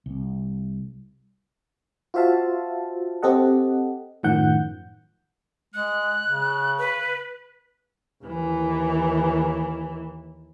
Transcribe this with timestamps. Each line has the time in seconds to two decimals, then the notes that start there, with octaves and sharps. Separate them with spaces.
0.06 C2
2.14 F4 F#4 C5 E5 F5 A5
3.23 C4 G4 A4 D#5 F#5
4.23 F#2 A2 D#3 F3 F#5 G6
5.74 G#3 F#6
6.27 C#3
6.78 B4
8.24 D#2 E3